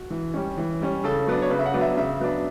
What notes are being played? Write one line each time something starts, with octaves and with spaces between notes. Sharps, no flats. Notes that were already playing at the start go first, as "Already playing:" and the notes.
Already playing: F#4
E3
G3 C#4
E3
G3 C#4
C#3 A4
F#3 B3 D4
C#5
C#3 B4
E5
F#5
F#3 B3 D4
E5
C#3 E5
F#3 B3 D4